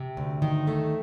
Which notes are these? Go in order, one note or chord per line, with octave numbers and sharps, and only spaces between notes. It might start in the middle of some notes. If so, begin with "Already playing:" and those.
Already playing: C3
D2
D#3
A3